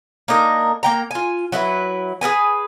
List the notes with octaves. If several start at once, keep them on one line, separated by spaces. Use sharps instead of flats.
A#3 D4 D#4 A#4
A#3 G5 A#5
F4 G#5
F#3 E4 F4 B4
G#4 A#4 B4 G#5